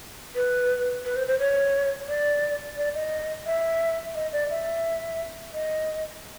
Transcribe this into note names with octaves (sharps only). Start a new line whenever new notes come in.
B4
B4
C5
C5
C#5
D5
D5
D#5
E5
D#5
D5
E5
D#5